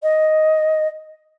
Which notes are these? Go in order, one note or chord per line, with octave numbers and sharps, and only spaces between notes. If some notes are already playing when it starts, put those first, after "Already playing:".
D#5